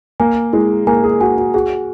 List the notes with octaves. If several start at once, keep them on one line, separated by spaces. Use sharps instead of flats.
A#3 G#5
G#3 E4
A#3 G#5
G#4
F#4 G#5
F#4
F#4 G#4